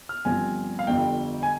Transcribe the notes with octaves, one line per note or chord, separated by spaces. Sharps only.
F6
G1 G2 F3 C4 G#5
F5
G1 F2 D3 G3 G5
G#5